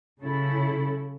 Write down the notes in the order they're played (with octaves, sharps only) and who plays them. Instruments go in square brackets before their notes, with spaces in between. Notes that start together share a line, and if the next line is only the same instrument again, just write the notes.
[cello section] C#3 F#3 C#4 E4 A4